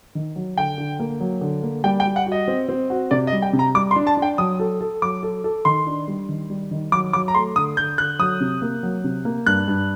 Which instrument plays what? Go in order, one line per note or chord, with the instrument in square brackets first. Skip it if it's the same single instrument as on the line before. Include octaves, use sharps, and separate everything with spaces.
[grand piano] D#3
F#3
[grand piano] D3 [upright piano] G5
[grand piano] D3
A#3
F#3
D3
A#3
[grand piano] G3 [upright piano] G5
[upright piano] G5
[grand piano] G3
[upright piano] F#5
[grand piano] F#4
[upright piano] D#5
[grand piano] C4
C4
F#4
[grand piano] C3 [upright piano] D5
[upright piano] D#5
[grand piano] G3
[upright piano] G5
[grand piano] C3
[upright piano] A#5
[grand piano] G3 [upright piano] D6
[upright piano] C6
[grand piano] D4
[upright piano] A5
[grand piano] D4
[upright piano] G5
[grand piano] F#3 [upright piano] D#6
[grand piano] A4
A4
[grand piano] F#3 [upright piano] D6
[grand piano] A4
A4
[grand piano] D#3 [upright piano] C6
[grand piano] D4
G3
D#3
G3
D#3
[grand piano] F#3 [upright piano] D6
[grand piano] F#3 [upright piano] D6
[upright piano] A#5
[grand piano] A3 [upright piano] C6
[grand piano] D3 [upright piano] D#6
[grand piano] D3 [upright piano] G6
[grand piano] D3 [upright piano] F#6
[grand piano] F#3 [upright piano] D#6
[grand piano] C3
A#3
F#3
C3
A#3
[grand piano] G2 [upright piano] F#6
[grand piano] G2